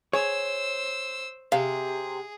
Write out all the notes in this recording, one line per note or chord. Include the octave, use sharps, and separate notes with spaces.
G#4 C5 C#5 E6
C3 G#4 F5